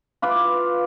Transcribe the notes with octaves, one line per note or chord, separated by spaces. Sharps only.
F4 B4 D6